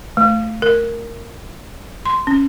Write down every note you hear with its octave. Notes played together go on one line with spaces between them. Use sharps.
A3
A#4
C6
C#4